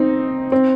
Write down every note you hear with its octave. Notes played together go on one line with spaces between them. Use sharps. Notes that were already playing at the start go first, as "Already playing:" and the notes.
Already playing: C4 D#4
C4